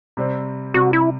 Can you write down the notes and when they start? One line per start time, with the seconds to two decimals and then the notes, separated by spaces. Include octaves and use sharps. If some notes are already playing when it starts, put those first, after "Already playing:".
0.17 C3 G3 C4
0.74 C3 G3 C4 F#4
0.93 E4